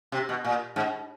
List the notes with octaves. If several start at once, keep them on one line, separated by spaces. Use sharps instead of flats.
C3
B2
A#2
G#2